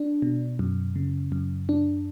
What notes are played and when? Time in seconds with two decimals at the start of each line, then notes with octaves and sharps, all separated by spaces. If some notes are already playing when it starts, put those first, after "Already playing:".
Already playing: D4
0.22 B2
0.59 F#2
0.96 C#3
1.32 F#2
1.69 D4